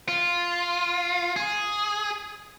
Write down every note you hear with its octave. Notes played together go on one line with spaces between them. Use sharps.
F4
G#4